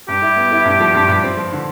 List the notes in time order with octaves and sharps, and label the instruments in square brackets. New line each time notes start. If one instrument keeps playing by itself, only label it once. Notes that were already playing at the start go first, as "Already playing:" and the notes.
[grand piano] G2 [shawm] G4
[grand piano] E4
B3
E4
G2
F3
G2
G2
C4
F3
D3